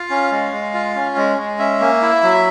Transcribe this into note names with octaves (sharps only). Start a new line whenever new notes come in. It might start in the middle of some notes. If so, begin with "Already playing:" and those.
Already playing: F4 F5
C#4
G#3
G#3
F4
C#4
G#3
G#3
C#4 E5
A#3
E4
F#3